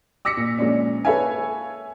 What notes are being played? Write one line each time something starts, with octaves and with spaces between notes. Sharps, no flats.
D6 E6 A#6 B6 C#7
A#2
A#2 F3 G#3 C#4 D4
A4 B4 C#5 E5 F5 G#5